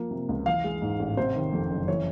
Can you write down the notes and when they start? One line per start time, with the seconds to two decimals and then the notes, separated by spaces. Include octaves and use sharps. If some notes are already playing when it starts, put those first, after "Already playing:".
Already playing: F3 A#3
0.11 C3
0.29 C#2
0.46 E3 F5
0.64 G#3
0.82 G#2
0.99 A1
1.17 C3 C5
1.35 D#3
1.53 F2
1.70 F#1
1.88 E3 C#5